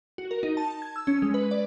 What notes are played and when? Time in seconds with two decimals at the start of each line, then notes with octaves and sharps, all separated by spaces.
0.18 F#4
0.31 A#4
0.43 D#4
0.57 A5
0.82 G#6
0.96 E6
1.07 C#4
1.22 G#3
1.34 B4
1.51 D5